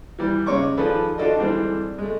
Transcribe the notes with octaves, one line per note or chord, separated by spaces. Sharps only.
E3 G3
C#3 G#3 C#5 C#6 D6
D#3 F3 D4 G#4 A4 B4
D4 F4 F#4 A4 D5 D#5
D3 E3 G3 G#3 C4 D4
G#3 A3